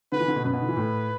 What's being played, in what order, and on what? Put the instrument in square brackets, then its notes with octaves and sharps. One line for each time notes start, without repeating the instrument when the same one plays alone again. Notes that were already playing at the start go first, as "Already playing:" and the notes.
[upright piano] D3 [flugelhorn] B4
[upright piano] E3
D3
B2
[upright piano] F#2 [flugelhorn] B4
[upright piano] B2
D3
E3
A2